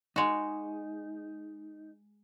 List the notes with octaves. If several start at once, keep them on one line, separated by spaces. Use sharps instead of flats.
G#3 D#4 F#4